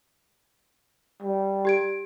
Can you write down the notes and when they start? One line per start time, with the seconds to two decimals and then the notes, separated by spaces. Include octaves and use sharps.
1.22 G3
1.65 G4 G#6 D7